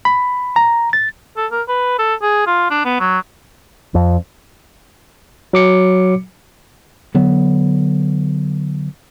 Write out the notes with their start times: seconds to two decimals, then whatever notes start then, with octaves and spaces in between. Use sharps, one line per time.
0.05 B5
0.56 A#5
0.93 A6
1.37 A4
1.52 A#4
1.68 B4
1.99 A4
2.22 G#4
2.47 F4
2.70 D4
2.85 B3
3.00 F#3
3.95 F2
5.53 F#3 D6 C#7
7.14 D3 F#3 B3